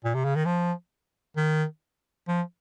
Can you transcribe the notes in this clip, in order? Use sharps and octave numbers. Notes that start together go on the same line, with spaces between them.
A#2
C3
C#3
D#3
F3
D#3
F3